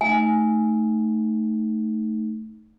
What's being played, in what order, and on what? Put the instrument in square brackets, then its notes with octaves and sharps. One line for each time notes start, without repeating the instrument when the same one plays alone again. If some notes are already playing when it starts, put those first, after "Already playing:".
[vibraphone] A3 D#4 [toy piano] G#5